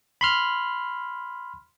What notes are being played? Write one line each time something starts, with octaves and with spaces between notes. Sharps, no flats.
B5 C6 F6